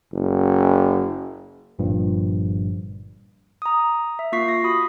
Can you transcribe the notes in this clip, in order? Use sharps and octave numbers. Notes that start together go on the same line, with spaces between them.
F#1
G1 G2 A#2 F3
A#5 D#6
E5
A#3 F4 C#6 B6 C7
A#6
F#4 B5 D#6